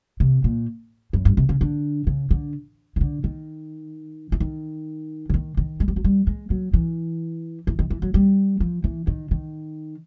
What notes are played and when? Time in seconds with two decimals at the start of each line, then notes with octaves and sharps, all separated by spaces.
0.20 C3
0.44 A#2
1.13 F#2
1.25 G2
1.37 C3
1.49 C#3
1.61 D3
2.07 C#3
2.31 D3
2.96 D#3
3.01 D3
3.24 D#3
4.32 E3
4.40 D#3
5.29 D3
5.34 D#3
5.57 D#3
5.80 G#3
5.88 G3
5.96 F#3
6.04 G3
6.27 G#3
6.50 F#3
6.73 E3
7.67 E3
7.79 D#3
7.90 E3
8.02 F#3
8.14 G3
8.60 F3
8.84 E3
9.07 D#3
9.31 D#3